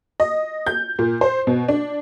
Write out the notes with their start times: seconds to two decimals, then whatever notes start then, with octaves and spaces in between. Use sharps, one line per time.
0.20 D#5
0.67 G6
0.99 A#2
1.21 C5
1.47 B2
1.68 D4